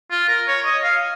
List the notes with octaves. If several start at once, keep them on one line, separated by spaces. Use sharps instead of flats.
F4
A#4
C#5
D#5
F5